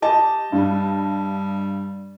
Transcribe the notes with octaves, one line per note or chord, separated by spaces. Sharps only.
G4 D#5 A5
G2 G3